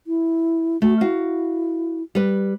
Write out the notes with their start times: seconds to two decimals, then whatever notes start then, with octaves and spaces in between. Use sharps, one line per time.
0.07 E4
0.82 A3 F#4
1.01 E4 F#4 F5
2.15 G3 B4